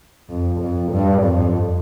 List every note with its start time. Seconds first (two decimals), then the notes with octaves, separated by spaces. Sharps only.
0.30 F2
0.61 F2
0.92 G2
1.23 F2